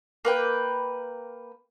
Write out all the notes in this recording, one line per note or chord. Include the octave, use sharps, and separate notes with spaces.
A#3 B4 G5